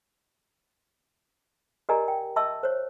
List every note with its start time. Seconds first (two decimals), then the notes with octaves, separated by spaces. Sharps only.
1.89 G4 A#4 D5 D#5 G#5 A#5
2.08 G5
2.36 D#5 E5 A5 C#6 E6
2.63 C5 C#5